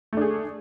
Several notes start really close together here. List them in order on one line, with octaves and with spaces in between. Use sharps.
A3 D4 G#4